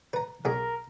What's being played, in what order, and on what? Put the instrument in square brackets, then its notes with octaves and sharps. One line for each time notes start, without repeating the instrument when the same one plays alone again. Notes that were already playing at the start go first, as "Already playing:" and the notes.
[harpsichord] B4 A#5
[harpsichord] B1 G#4 D6 [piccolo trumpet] A#4